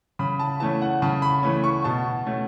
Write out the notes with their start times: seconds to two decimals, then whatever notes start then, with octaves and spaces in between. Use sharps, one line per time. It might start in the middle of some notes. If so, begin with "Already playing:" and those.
0.19 C#3 B5
0.39 A5
0.60 E3 A3 C#4 A5
0.82 F#5
1.02 C#3 A5
1.22 B5
1.43 E3 A3 C#4
1.64 C#6
1.84 B2 A5
2.26 A3 C#4